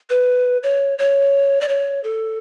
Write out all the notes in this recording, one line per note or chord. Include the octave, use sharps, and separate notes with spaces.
B4
C#5
C#5
D5
C#5
A4